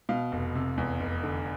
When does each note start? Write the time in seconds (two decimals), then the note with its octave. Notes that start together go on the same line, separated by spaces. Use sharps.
0.09 B2 F5
0.32 F1
0.55 C3
0.78 E2
1.00 F1
1.23 D3